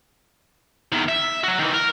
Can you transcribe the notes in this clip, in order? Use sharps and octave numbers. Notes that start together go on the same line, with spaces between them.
E2 D#3
E5
F#3 F#4
D#3 E3
A#4